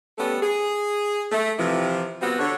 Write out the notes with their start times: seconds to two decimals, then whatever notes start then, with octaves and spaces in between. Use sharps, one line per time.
0.18 G3 A3 B3 C#4 A4
0.42 G#4
1.32 A3
1.58 C3 E3 F3
2.22 C3 G3 B3 C4 F4 F#4
2.39 D3 C#5